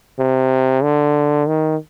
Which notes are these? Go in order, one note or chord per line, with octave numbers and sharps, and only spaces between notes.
C3
D3
D#3